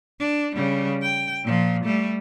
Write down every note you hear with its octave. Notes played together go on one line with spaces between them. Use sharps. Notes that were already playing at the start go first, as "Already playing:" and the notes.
D4
C#3 G3
G5
A#2 F3
G3 A3